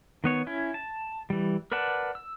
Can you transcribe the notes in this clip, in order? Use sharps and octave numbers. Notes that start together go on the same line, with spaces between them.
D#3 B3 C#5
C#4 E4
A5
E3 G3
A#4 B4 D5 F#5 A5
E6